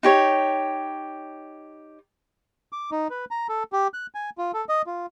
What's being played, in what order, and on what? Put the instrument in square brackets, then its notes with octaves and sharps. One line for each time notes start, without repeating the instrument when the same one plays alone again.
[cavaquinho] D#4 G4 C#5
[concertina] D6
D#4
B4
A#5
A4
G4
F#6
G#5
F4
A4
D#5
F4